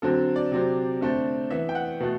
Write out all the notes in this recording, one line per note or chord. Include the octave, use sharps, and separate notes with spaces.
D3 F#3 C4 A4
D5
C3 F#3 C4
D3 A3 C4
E3 B3 E5
G5
F#5
B2 A3